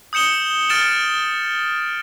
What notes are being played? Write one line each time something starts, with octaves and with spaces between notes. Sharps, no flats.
D#6 G6 C#7 E7 G7
F6 A6 D7 E7 G7